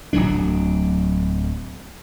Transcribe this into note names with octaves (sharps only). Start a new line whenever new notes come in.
D1 F2 F#3 D4